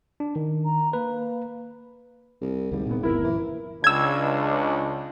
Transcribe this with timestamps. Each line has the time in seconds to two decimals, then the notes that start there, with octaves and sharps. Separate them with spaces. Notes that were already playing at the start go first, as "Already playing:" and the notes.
0.20 D4
0.36 D#3
0.65 A#5
0.93 A#3 B4
2.42 C2
2.72 G#1 D2 G3
2.86 A#2 B3
3.03 G1 D2 B3 E4 A#4
3.24 F#2 A#2 E3
3.84 C#2 D4 E6 G#6